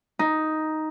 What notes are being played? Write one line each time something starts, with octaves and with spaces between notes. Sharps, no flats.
D#4